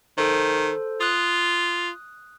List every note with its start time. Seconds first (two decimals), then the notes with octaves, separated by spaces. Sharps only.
0.18 D#3 A4 C5
1.01 F4 D#6 F#6